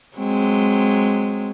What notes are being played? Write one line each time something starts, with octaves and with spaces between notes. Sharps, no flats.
F#3 G#3 C4